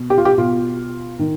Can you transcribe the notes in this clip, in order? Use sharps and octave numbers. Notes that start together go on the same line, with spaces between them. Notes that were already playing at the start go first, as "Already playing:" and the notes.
Already playing: B2
G4
F4
G4
B2 F4
D#3